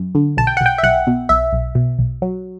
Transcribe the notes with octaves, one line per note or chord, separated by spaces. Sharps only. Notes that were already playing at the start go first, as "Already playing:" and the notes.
Already playing: F#2
D3
B1 A5
G5
B1 F#5
G5
E5
B1 F#5
B2
B1 E5
B1
B2
B1
F#3